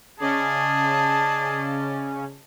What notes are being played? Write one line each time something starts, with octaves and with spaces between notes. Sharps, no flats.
C#3 C#4 G#4 D5 D#5 A5